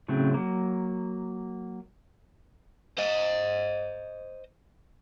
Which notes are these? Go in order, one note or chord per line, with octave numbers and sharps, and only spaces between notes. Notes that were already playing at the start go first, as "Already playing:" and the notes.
A2 C#3 F#3 A3 C4
F#3 A#3
C5 D#5